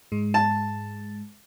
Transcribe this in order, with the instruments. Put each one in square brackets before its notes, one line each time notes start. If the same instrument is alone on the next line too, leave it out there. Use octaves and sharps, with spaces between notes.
[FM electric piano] G#2 G#3
[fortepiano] A5